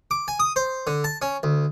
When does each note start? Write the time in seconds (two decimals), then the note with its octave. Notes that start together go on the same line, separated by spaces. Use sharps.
0.11 D6
0.28 G#5
0.40 D#6
0.56 C5
0.87 D3
1.04 A5
1.22 C#4
1.43 D2